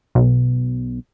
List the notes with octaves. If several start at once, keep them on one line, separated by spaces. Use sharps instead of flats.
B1